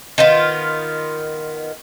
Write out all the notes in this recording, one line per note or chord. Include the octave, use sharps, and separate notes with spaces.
D#3 B3 F4